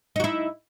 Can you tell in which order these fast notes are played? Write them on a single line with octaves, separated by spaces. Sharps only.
D#4 F#4 E4